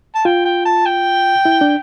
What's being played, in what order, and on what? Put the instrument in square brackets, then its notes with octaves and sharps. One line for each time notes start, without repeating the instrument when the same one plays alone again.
[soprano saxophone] A5
[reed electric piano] F4 [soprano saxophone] G5
[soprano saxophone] G5
A5
G5
[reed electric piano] E4
D4